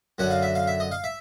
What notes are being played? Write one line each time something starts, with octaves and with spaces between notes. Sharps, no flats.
F#2 D3 F#3 F#5
F5
E5
F5
E5
D#5
F5
E5